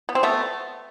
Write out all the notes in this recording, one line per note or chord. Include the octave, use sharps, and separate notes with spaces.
B3
C4
A3 B3